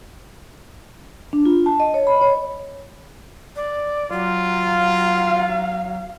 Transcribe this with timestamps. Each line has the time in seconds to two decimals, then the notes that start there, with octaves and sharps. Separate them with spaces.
1.33 D4
1.45 F4
1.66 A5
1.80 D#5
1.94 C#5
2.07 B5
2.21 C#5
3.56 D5
4.12 F#3 F4
4.66 F5